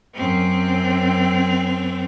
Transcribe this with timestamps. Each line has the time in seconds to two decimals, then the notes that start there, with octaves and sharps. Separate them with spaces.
0.15 F#2 C4